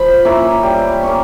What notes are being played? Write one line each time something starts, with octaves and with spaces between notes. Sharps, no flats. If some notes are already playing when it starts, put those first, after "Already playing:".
Already playing: F3 B5
A#3 C#4 E4
G3
A#3 C#4